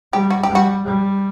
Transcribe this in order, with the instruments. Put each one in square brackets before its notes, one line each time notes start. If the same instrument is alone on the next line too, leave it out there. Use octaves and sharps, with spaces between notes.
[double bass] G3 [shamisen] G4
[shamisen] F#4
G4
[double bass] G3
[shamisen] F#4
[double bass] G3